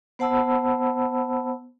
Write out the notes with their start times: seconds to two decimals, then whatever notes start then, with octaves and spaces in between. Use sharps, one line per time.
0.19 B3 C5 F#5 A5 B5 E6